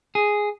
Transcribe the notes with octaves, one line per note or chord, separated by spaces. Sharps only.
G#4